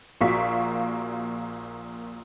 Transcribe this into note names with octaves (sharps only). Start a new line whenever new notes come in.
A#1 A#2 A#3 F#4 C#6 B6